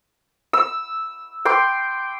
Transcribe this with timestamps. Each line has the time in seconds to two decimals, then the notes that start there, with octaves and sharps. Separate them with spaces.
0.53 E6
1.45 G5 C6 D6